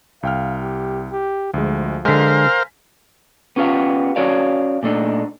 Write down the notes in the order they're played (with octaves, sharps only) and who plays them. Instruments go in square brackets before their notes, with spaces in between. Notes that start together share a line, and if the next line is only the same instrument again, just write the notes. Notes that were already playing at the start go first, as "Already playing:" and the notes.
[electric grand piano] C2 G5 F6 [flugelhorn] F5
[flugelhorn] G4
G4
[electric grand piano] D2 G#3 [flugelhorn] F3
[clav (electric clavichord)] D3 G#3 [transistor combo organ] A#4 C5 F5 [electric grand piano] G#5 B6
[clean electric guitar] B3 C#4 F4 G4 F5
C#4 F#4 C#5 D5 F5
A#2 A3 D4 D#4